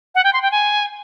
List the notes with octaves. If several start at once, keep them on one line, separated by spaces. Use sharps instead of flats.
F#5
G5
C6
G5
G#5